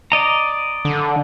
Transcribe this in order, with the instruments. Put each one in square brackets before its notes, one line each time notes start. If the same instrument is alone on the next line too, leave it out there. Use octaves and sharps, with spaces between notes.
[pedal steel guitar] D5 D#5 A#5
[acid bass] D3